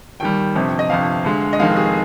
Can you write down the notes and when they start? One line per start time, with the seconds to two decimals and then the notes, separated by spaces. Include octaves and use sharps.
0.20 D#2 D#3 G3 G5
0.55 G1 F2 C3
0.79 D#5
0.90 G1 F2 C3 F5
1.24 D2 D3 G#3
1.53 D#5
1.59 F1 F2 D#3 G#3 F5
1.77 G#4